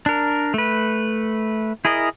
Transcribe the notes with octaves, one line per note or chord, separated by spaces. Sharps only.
D4 A#4
A3 B4
E4 G#4 A#4 D#5